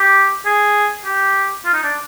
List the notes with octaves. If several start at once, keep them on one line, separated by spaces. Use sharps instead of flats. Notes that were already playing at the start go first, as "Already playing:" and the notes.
Already playing: G4
G#4
G4
F4
D#4
D4